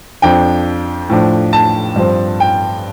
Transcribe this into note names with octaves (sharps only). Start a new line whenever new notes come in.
F2 F3 D4 G5
A2 F3 D4
A5
G2 F3 C4
G5